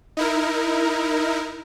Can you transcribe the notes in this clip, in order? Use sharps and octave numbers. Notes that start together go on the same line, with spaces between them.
D#4 E4 A#4